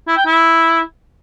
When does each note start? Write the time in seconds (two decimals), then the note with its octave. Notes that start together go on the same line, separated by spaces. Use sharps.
0.08 E4
0.17 G5
0.26 E4